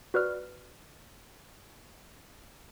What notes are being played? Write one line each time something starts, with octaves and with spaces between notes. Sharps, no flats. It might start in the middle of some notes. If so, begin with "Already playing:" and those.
F#4 B4 D5 F6